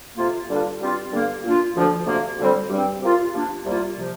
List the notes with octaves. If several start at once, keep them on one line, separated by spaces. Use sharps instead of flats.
F2 C3 A#3 F4
G2 D3 G3 D4 F4
G2 G3 C4 F4
G2 D3 A#3
A#2 A#3 D4 F4
D2 D3 F3
D2 C3 A#3
D2 D3 G3 C4
G2 G3 C4
C3 A#3 F4
C3 F3 A#3 D4
C2 C3 G3 A#3 F4
C3 F3